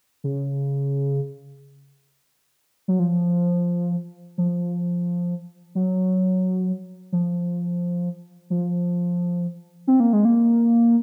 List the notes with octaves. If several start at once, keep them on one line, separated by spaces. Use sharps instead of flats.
C#3
F#3
F3
F3
F#3
F3
F3
C4
A#3
G#3
A#3